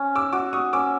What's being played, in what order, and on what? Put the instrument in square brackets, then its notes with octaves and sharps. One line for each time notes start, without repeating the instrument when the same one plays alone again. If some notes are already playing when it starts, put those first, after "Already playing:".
Already playing: [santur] C#4
[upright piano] D6 E6
[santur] F#4 [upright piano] D6 E6
[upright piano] C#6 D#6
[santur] C#4 [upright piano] D6 E6